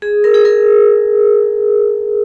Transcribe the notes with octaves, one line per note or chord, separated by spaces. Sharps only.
G#4
A#4
G#4
A#4